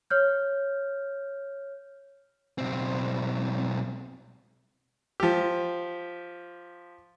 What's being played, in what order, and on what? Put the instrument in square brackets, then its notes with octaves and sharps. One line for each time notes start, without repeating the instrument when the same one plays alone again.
[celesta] C#5 F6 G6
[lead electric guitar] B1 C4
[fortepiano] F3 G4